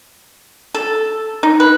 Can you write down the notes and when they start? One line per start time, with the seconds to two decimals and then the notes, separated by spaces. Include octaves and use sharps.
0.74 A4
1.43 D#4
1.60 B4